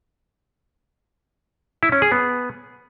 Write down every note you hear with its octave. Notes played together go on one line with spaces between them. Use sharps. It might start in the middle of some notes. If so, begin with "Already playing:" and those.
E4
C#4
G#4
B3